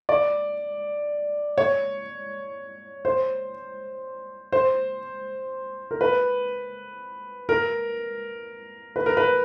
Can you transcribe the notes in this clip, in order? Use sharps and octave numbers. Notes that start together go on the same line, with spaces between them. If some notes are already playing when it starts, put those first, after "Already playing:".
D5
C#5
C5
C5
A#4
B4
A#4
B4
A#4
B4